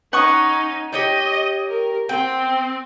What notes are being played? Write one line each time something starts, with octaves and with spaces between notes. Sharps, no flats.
C#4 D#4 F#5 C#6 D#6
G4 C#5 D#5 G5
A#4
C4 G5